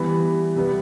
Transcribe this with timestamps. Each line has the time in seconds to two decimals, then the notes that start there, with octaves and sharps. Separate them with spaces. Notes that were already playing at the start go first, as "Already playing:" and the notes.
Already playing: E3 G3 B3 B5
0.56 C3 G3 B3